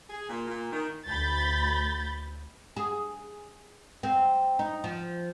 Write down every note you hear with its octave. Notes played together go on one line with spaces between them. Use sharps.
G#4
A#2
A#2
D#3
D2 B5 G6 A6
G#4
C4
D#4
F3